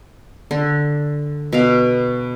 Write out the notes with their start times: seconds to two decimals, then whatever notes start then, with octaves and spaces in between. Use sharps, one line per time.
0.51 D3
1.53 B2 F5